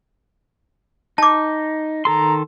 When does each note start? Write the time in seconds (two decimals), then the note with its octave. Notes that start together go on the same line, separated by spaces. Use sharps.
1.18 D#4 A5 D6
2.05 D#3 A4 A#5 C6